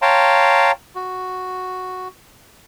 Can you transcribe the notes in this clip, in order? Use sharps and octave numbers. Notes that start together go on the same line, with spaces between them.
C#5 F5 G5 A5 A#5 C6
F#4